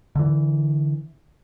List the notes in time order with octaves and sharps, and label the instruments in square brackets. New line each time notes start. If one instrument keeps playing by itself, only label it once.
[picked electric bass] D3 E3